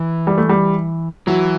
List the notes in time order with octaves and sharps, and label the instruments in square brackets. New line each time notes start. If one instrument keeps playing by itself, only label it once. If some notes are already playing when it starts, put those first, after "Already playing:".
Already playing: [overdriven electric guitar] E3
[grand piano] G3
A3
G3
[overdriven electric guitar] E3 [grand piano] F#3